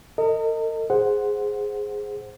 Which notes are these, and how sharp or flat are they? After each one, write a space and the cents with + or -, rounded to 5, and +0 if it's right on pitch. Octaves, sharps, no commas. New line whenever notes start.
A#4 -45 D#5 +0
G#4 +0 C5 +0 F#5 +0